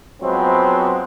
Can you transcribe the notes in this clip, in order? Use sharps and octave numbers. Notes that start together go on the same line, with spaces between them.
F3 F#3 G#3 B3 C4